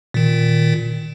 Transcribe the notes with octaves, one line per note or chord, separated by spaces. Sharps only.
A#2 D#3